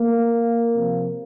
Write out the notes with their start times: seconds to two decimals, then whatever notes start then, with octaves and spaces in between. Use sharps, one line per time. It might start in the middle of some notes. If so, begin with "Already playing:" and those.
Already playing: A#3
0.73 C3 F3